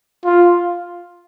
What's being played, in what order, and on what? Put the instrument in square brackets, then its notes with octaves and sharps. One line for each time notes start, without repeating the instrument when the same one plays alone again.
[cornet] F4